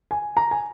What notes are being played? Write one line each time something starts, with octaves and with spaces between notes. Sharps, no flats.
G#5
A#5
G#5